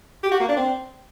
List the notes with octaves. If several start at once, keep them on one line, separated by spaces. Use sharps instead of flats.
G4
F#4
A#3
D4
C4